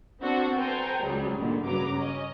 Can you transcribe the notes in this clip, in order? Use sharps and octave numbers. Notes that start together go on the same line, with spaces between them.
B3 C4 D4 F#4 A4
A4 B4 C5 G5 G#5 A#5
C#2 F#3 G3 G#4
A#2 D3 D#3
G2 C#3 F#3 B4 A#5 D6
C#4 D#5